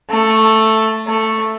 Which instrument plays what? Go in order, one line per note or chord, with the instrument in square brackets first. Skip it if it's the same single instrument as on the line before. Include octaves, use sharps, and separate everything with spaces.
[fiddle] A3
A3